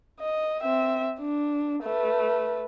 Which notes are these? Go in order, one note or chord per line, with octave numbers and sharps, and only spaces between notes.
D#5
C4 E5
D4
A3 B4